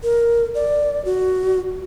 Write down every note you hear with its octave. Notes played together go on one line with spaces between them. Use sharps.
A#4
D5
F#4